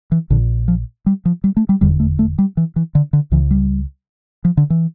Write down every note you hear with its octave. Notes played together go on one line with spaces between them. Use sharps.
E3
A#1 A#2 D3
F3
G3
F3
G3
A3
G3
F1 E2 D3 G3
A3
A3
G3
E3
E3
D3
D3
C#2 C#3 E3
G3
F3
D3
E3